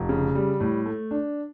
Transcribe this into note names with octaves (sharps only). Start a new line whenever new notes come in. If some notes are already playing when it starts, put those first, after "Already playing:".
Already playing: F1
C#3
G3
A2
A3
D4